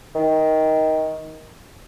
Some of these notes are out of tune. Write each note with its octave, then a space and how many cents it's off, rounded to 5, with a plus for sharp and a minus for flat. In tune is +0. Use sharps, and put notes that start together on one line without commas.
D#3 +15